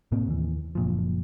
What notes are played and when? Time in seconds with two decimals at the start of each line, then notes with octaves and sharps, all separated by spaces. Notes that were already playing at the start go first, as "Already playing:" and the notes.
0.12 A2 C3 A#3 C4
0.28 D#2 E3
0.75 F#1 A#2 F3